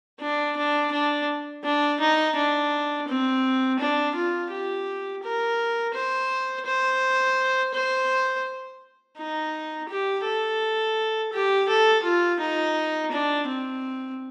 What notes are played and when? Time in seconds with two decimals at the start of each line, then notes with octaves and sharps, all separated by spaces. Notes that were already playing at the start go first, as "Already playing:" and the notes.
0.20 D4
0.57 D4
0.92 D4
1.64 D4
2.00 D#4
2.36 D4
3.08 C4
3.79 D4
4.15 F4
4.50 G4
5.23 A#4
5.94 C5
6.66 C5
7.74 C5
9.17 D#4
9.89 G4
10.24 A4
11.33 G4
11.68 A4
12.03 F4
12.40 D#4
13.11 D4
13.47 C4